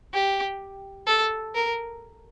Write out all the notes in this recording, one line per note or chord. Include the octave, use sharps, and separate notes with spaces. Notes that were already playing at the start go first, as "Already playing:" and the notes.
G4
A4
A#4